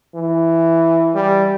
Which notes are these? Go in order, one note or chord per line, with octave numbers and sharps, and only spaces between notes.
E3
G3